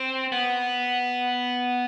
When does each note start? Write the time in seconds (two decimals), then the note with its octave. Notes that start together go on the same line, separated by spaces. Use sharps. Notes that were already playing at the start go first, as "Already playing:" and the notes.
Already playing: C4
0.32 B3